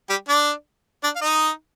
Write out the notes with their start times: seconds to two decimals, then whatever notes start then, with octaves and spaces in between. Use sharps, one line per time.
0.09 G3 G4
0.28 D4 D5
1.03 D4 D5
1.16 F5
1.21 D#4 D#5